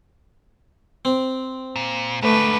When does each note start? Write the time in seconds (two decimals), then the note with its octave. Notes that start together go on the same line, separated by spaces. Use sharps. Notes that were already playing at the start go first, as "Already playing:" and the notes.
1.05 C4
1.76 A#2
2.22 G#2 D3 A3 B4